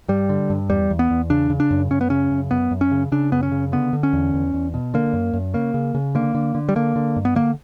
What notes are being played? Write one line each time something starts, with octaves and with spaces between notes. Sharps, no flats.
G2 G3
D3
G2
E2 G3
E2
B3
E2
C#3 D4
C#3
D4
F#2
F#2 C#4
B3
C#3 C#4
F#2
F#2 B3
F#2
C#4
C#3
C#3 D4
F#2 B3
C#4
C#3
D3 B3
D3
C#4
E2
E2
E2
B2
D3 A#3
F#2
F#2
C#3 A#3
C#3
C#3
D3 A#3
D3
D3
G3
D3 A#3
D3
G2
B3
D3 A#3